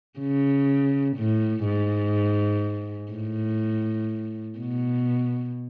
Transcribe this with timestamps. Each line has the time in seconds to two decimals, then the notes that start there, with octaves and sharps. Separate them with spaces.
0.20 C#3
1.17 A2
1.65 G#2
3.12 A2
4.59 B2